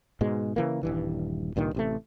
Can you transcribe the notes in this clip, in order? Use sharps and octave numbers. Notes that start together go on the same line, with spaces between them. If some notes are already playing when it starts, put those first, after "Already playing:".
G#2 B2 G#3
C#3 E3 A#3
D#1 G2 E3
C#2 G2 A#2 D#3
A1 C3 A3